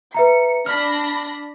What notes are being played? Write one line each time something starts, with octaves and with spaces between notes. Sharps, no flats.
B4 E5 A#5 C#7
D4 B5 F6 A#6